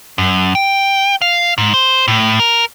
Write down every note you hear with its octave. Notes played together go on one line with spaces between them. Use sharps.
F#2
G5
F5
G#2
C5
A2
A#4